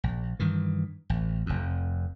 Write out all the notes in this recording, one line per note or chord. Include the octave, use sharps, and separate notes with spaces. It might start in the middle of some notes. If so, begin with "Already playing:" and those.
A#1
G2 D#3 E3
A1
F1 F2